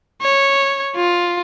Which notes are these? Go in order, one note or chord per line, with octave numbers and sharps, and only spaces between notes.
C#5
F4